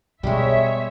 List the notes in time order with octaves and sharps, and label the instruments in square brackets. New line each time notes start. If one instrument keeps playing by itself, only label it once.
[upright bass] B2 [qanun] G3 G#3 [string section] C#5 E5